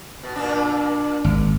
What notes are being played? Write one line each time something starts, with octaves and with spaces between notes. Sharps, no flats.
B2
A#2 D4
G#1